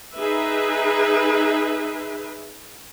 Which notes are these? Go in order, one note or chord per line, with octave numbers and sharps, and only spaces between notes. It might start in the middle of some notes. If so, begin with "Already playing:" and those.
D#4 G#4 B4 E5